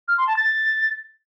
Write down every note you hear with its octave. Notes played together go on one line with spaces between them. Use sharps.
F6
C6
A5
A6